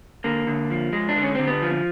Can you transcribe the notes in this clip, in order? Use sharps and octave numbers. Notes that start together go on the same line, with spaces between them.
D3 A#3
D3
F3
G#3
D4
D3
C#4
D3 C4
B3
F3